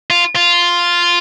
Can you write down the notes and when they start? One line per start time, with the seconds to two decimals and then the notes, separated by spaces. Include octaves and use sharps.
0.10 F4
0.36 F4